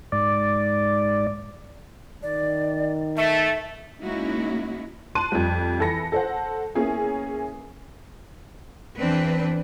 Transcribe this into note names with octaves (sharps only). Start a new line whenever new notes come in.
G#2 D5
D#3 D5
A3 E5
G#3 A#3 C#4 D#4 E4 F#4
A5 C6 F#6 D#7
F2 G3
E3 A4 B5 A#6 C#7
A4 C5 F#5
A#3 B3 C#4 E4 G#4 A#4
E2 E3 C4 D4 B4